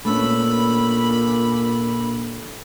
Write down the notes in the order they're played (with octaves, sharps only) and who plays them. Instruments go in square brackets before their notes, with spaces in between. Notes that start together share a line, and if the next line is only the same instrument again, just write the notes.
[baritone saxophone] A#2 [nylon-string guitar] A3 B3 C#4 [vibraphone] D4 E6 [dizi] B5